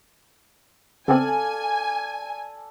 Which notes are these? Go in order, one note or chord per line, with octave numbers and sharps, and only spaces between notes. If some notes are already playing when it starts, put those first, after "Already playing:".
C#3 B3 C4 A4 D5 F5 G#5